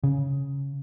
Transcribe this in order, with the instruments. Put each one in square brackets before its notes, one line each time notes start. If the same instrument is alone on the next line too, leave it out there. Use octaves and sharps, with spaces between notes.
[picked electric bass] C#3